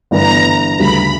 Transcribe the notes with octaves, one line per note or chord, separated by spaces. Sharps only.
G1 G2 E3 B3 A#5
D2 C#3 G3 B5